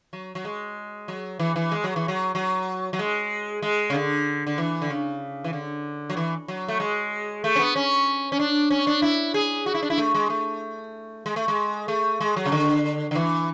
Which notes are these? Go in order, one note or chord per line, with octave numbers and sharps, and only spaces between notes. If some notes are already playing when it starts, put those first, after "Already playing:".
F#3
F#3
G#3
F#3
E3
E3
G#3
F#3
E3
F#3
F#3
F#3
G#3
G#3
C#3
D3
D3
E3
D3
C#3
E3
D3
F#3
E3
F#3
A3
G#3
A3
C#4
B3
C#4
C#4
D4
C#4
D4
E4
G#4
F#4
E4
D4
E4
A3
G#3
A3
G#3
A3
G#3
A3
G#3
F#3
C#3
D3
D3
E3